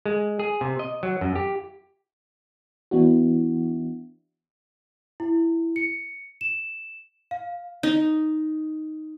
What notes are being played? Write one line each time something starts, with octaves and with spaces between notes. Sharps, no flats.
G#3
G#4
C3
D#5
F#3
F#2
G4
E3 B3 D4 E4 F#4
E4
C#7
E7
F5
D#4